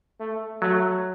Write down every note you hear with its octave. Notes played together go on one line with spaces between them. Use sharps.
A3
F#3 A3